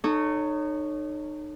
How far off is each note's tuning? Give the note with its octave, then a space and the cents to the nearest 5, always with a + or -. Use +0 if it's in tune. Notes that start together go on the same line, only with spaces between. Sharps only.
D#4 -30 A4 +0 C#5 +0